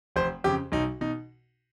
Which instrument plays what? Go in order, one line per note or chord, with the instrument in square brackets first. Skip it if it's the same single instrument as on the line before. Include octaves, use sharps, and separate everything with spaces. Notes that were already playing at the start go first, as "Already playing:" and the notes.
[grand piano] F1 C5
F2 C#3 G4
B1 D#4
B2 D#4